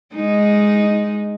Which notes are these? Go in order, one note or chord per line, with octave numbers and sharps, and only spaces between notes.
G#3 D#4